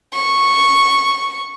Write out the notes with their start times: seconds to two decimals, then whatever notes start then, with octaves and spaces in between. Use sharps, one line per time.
0.14 C#6